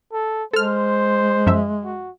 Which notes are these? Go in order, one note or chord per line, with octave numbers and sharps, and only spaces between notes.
A4
G#3 A4 C5 F6
F#2 F3 E5
F#4